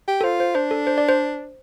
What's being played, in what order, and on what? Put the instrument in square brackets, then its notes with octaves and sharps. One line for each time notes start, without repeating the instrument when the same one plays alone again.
[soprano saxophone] G4
[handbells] A4
[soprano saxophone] F4 [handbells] C5
[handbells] C5
[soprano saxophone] D4 [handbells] C5
[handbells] A4
C5
D5
C5